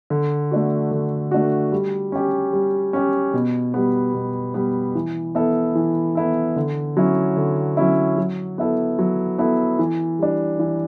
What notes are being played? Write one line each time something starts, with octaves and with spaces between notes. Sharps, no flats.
D3
A3 D4 F#4
D3
A3 D4 F#4
G3
C#4 G4
G3
C#4 G4
B2
G3 B3
B2
G3 B3
E3
B3 E4 A4
E3
B3 E4 A4
D3
F#3 C#4 E4
D3
F#3 C#4 E4
F#3
B3 E4 A4
F#3
B3 E4 A4
E3
G3 D4
E3